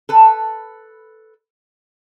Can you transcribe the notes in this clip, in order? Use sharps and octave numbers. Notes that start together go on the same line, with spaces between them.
A4 B4